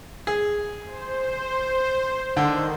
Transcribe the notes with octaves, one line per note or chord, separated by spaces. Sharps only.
G#4
C5
D3 D#3